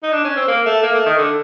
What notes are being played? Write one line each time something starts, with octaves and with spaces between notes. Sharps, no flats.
D#4
D4
C#4
C4
A#3
A3
A#3
A3
D#3
D3